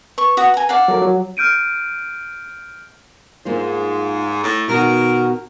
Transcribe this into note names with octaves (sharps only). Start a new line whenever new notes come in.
B4 C#6
F#4 D#6
G#5 A#5
D5 F5 F#5
F#3 A4 A#4
F#3
F6 G6 D7 D#7
G#2 A#3 F4 C5
A2
B2 D#3 F#4 A#4